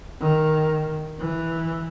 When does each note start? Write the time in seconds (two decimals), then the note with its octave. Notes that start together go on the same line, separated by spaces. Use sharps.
0.21 D#3
1.19 E3